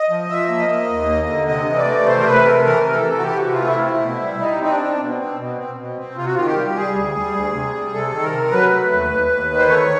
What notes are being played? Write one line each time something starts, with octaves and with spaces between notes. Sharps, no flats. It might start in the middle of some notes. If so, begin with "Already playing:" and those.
Already playing: D#5
F3
F3 E5
A#3
D#5
A#3
D#2
A#3
D3
C3 D#5
E3
D5
A3
C3 C5
A#4
C3 B4
A3 A#4
E3 A#4
C3
A4
E3
F#4
E3 G4
C3 F#4
F4
A3
E4
C4
B2
G3
G3 D#4
C4 D#4
D4
C4
B2
C4
B2
C4
B2
C4
C3 F4
F#4
D#3 F4
G4
G3
G3 G#4
D2
G3
D2
C3
G3
C3 A4
D#3
A#4
C3
F#3 B4
A3
D#2
D#2
D#2
D#3
C5
A3 C#5